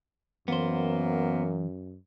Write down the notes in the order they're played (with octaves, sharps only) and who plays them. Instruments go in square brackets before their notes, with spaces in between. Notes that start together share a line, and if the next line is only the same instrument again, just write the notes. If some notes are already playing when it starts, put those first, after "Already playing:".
[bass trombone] F#2 [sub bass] E3 [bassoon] A#3 [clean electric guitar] B3 C5